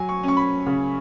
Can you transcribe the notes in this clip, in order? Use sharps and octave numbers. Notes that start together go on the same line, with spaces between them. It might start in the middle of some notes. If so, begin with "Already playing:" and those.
Already playing: F#3 G#5
C#6
C#4 C#6
B5
C#3